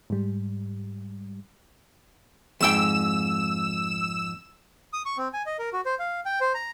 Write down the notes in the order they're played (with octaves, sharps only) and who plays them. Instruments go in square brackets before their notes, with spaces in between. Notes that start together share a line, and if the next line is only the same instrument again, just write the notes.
[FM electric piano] G#2 G3
[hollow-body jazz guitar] F2 G#2 G5 [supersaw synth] E6 E7
[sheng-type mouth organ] D#6
C#6
C4
G#5
D#5
A#4
F#4
C5
F5
G5
C5
A#5